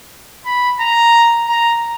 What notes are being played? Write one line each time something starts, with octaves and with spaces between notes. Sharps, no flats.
B5
A#5
A#5